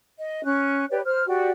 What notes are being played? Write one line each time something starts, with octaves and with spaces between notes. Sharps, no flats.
D#5
C#4 F#6
G4 B4 C#5 D5
C5 F6
F#4 G4 D5 G5